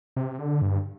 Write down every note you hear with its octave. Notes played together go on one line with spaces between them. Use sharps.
C3
D3
G2